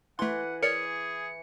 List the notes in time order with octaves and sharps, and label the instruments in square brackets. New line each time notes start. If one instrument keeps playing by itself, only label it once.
[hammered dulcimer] E3 B4 [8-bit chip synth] A3 C6 [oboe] F#5
[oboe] G#4 [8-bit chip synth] A#4 C#5 D5 [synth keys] C#7